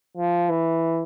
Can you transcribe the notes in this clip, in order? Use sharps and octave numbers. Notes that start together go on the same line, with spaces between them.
F3
E3